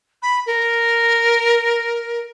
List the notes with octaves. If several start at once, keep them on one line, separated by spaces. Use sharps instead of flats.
B5
A#4